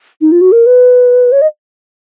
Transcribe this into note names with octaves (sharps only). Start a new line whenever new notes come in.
D#4
F4
F#4
A#4
B4
C#5
D#5